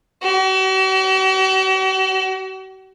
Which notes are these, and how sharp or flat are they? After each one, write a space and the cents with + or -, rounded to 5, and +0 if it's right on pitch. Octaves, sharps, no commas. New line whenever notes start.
F#4 +45